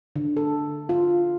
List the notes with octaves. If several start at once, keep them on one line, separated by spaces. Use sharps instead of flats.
D3
A4
F4